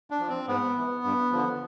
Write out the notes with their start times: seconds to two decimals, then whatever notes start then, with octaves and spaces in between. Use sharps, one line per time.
0.10 D4
0.20 F3
0.29 C4
0.48 G#2 B3
0.76 E3
1.04 G2
1.32 D3 F3